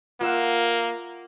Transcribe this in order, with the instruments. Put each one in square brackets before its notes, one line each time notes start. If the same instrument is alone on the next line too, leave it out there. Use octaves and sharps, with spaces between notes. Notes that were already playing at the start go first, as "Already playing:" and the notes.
[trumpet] A#3 [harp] F4 E5 F#5